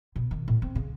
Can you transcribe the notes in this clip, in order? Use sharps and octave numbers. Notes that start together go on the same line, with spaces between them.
B2
D#3
A2
C4
C#3